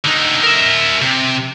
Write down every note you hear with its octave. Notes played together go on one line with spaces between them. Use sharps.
D3 D#4
A#4 E5
C3